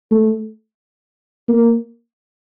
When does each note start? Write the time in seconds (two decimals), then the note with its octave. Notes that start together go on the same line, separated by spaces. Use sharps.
0.11 A3
1.49 A#3